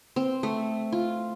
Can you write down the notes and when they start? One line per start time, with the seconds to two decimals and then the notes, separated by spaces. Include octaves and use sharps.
0.16 C4
0.43 A3
0.92 F4